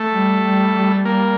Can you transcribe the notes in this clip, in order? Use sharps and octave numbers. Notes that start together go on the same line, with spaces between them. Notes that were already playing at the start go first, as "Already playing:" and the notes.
Already playing: A3
G3
G3
G3
G3 A#3